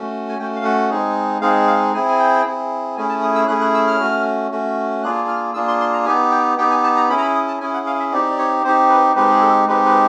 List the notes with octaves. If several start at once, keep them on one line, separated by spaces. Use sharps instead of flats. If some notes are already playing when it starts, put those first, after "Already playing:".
Already playing: A3 C#4 F#4
G#5
A3 C#4 F#4 G5
F5
F#5
G#3 C4 D#4 G#4
G#3 C4 D#4 G#4 F5
F5
C4 E4 G#4 G#5
G#5
G5
C4 E4 G#4
A3 C#4 E4 G#4 G#5
A5
D#6
E6
A3 C#4 E4 G#4 F#6
F#6
E6
F6
A3 C#4 F#4
A3 C#4 F#4
A#3 D4 F4 G#4 F#6
F6
A#3 D4 F4 G#4 E6
C6
C6
A#5
B3 D#4 G4 G#5
G5
B3 D#4 G4 G5
G#5
A5
A#5
C#4 E4 G#4 B5
A#5
B5
D#6
A5
C#4 E4 G#4 G#5
F#5
F5
E5
C4 D#4 G4 D5
D5
C#5
C4 D#4 G4 C5
B4
G#3 C4 D#4 G4 B4
G#4
A4
G#3 C4 D#4 G4 B4
B4